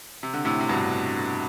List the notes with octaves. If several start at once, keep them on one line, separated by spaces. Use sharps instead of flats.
C3
D3
A2 C3
C3
G2 B2